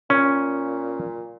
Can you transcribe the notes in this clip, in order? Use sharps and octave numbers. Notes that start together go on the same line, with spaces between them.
A#2 C#4